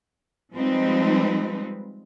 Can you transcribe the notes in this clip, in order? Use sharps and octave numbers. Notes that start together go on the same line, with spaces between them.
F3 G3 G#3 C4 D#4 B4